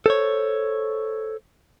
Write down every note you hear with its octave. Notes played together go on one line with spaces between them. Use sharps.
A4 C5 C#5